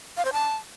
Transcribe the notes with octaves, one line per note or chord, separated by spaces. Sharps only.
F5
C5
A5